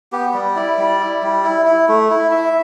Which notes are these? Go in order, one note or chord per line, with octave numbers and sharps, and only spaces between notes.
B3 G4
G3
E4 D5
G3
E4
G3
E4
E4
A3
E4
E4 E5